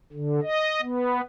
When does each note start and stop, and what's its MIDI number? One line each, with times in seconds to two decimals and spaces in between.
0.13 0.40 50
0.43 0.81 75
0.81 1.21 59